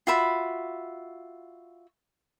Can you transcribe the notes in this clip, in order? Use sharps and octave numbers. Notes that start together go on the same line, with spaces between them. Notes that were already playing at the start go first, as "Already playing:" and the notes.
F4 F#4 E5 B5